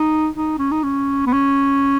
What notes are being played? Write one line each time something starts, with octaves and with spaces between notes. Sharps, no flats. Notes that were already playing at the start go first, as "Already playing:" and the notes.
Already playing: D#4
D#4
C#4
D#4
C#4
B3
C#4